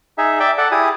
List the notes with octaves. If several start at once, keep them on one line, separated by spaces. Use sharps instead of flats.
D#4 G#4 E5
D5 E5 G5
A4 D5 F#5
E4 G4 G#4 D#6